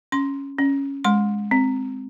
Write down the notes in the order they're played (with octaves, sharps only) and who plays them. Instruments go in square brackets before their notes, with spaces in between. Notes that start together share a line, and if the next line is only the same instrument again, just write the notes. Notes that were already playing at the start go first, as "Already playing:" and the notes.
[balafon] C#4 C6
C#4
G#3 C6
C4